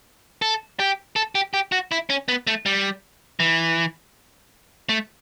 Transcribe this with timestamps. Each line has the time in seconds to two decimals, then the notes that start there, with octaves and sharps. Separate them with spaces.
0.42 A4
0.80 G4
1.16 A4
1.35 G4
1.54 G4
1.72 F#4
1.92 E4
2.10 C#4
2.28 B3
2.47 A3
2.66 G3
3.40 E3
4.89 A3